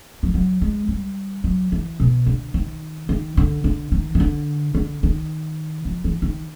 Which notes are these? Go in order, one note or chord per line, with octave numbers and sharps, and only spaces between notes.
F3
F#3
G#3
G3
F#3
E3
B2
D3
D#3
D#3
D3
D3
D#3
D#3
D3
D3
D#3
F3
E3
D#3